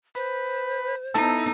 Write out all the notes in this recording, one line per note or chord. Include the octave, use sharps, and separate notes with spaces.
B4 C5
B3 D#4 E4 A4